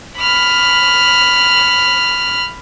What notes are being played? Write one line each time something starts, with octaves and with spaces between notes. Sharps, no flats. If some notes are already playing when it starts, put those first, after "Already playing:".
B5 F6